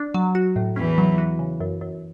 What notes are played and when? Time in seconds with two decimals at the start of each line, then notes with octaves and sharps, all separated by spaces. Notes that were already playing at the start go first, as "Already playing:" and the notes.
Already playing: D4
0.14 F#3
0.35 F#4
0.56 A2
0.76 E2 E3 C#4
0.98 F#3
1.18 F#4
1.39 C#3
1.60 F#2
1.81 F#2